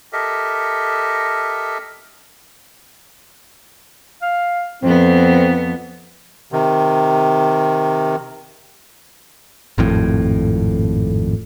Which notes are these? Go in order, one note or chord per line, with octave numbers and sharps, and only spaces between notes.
G4 A4 A#4 D#5 E5
F5
F2 B3 C4
C3 D#3
G#1 F2 A2